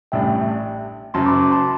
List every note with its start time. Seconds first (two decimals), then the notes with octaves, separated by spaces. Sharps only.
0.12 A1 A2 G3 D4 E5 G5
1.14 F#1 F#2 F#3 A5 C6
1.26 B5 D6
1.52 A5 C6